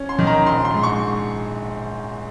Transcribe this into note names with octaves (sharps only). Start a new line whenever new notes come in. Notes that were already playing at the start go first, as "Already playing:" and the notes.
Already playing: C#4
C6
D#3
A#5
A#1 C6
C6
G#2
C#6